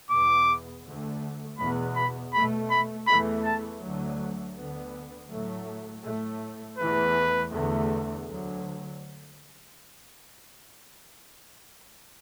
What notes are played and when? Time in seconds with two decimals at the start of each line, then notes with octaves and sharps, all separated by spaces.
0.10 E2 B2 B3 D6
0.85 D2 D3 A3
1.58 E2 B2 B3 B5
1.96 B5
2.33 B2 A3 B5
2.70 B5
3.07 E2 E3 A3 B5
3.44 A5
3.81 D2 D3 F#3 A3
4.56 D2 D3 B3
5.30 A2 F#3 A3
6.04 A2 A3
6.78 E2 E3 A3 B4
7.53 E2 D3 A3
8.27 D2 D3 F#3